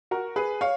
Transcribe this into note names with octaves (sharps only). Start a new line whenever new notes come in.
F#4 A#4
G#4 B4
C#5 F5